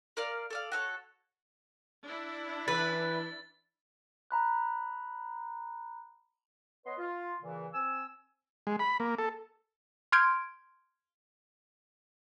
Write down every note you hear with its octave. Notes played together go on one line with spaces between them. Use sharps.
A#4 D5 F5
A4 D5 F5
F#4 A4 C#5
D4 E4
E3 B4 A6
A#5 B5 F#6
B3 B4 C#5 D#5 C6
F4
A#2 C#3 E3
C4 G#5 E6
G#3
B5
A#3
A4
C6 F6 G6 G#6 D7